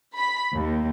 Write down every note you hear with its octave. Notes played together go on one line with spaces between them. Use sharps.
B5
D#2